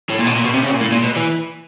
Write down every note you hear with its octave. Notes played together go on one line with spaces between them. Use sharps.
A2
A#2
B2
A#2
B2
C3
C#3
A#2
A2
A#2
B2
E3